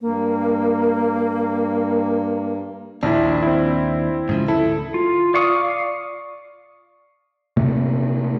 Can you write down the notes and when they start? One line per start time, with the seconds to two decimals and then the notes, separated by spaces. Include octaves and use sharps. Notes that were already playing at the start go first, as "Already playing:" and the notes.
0.01 G2 A#3
3.03 A#1 D#2 D4 E4
3.42 C4 E4
4.29 G#2 C#3 F3
4.48 D2 E4 A4
4.94 F4
5.34 D5 F5 C#6 D#6
7.57 C3 A3 A#3